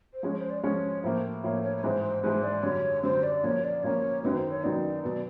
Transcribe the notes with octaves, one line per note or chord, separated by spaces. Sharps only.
C5
F3 G#3 C#4 C#5
C5
D5
F3 G#3 C#4 C#5
A2 F3 A#3 C5
A2 F3 A#3 C#5
C#5
C#5
G#2 E3 G#3 C5
C5
G#2 E3 G#3 C5
D5
F#2 D3 G3 C#5
F#2 D3 G3 C5
D5
A#2 F3 A#3 C#4 C#5
D5
A#2 F3 A#3 C#4 C#5
F#2 D#3 F#3 B3 D#4 B4
C5
C#5
F#2 D#3 F#3 B3 D#4 D5
B2 F#3 B3 D5